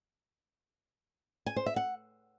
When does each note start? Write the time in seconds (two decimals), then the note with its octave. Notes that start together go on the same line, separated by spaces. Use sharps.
1.46 G#5
1.56 C5
1.66 E5
1.76 F#5